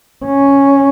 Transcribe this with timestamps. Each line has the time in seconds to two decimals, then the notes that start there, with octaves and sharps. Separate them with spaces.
0.25 C#4